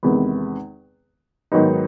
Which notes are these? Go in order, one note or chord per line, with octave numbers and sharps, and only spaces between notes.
E2 C3 D#3 G#3 B3
G#2 D#3 F#3 B3 D#4